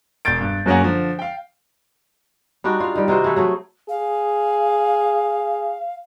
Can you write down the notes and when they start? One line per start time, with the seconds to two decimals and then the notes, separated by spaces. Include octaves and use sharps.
0.25 E1 G6 A6 D7
0.41 G2
0.66 F#2 F#3 A#3 C#4 G#4 F#5
0.81 D3 F3
1.19 F5 G5
2.64 G3 D4 D#4 F#4
2.80 F4 F5
2.95 D#3 G3
3.08 C3 D#4 F#4 C5
3.24 E3 A3
3.36 F#3 A3 G#4
3.89 G#4 F5